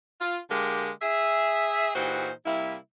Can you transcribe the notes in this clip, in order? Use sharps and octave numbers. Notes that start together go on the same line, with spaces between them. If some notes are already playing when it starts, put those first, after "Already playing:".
F4
D3 G#3 A#3 G4 A#4
G#4 E5
A#2 E3 D#4 F#4 G4 C5
C3 G3 A#3 E4